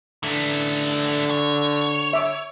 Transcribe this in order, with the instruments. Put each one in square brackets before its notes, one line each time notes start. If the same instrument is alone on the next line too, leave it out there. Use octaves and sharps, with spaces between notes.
[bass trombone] D3 [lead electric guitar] E3 A3
[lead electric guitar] C#5
[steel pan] E5 D6